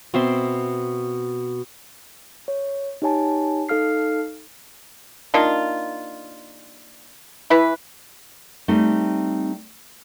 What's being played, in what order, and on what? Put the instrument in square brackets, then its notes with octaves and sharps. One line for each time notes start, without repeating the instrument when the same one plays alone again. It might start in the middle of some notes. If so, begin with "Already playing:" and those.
[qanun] B2 C4 E5 C6
[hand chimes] C#5
D#4 G4 C#5 G#5 A5
D#4 A4 F5 F6 C7
[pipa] A#3 D4 D#4 F4
E3 E4 B4
[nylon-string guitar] G3 A3 C4 D#4